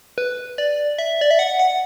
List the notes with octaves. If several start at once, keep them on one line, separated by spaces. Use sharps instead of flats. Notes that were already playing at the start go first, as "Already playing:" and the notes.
B4
D5
E5
D5
E5
F#5
F#5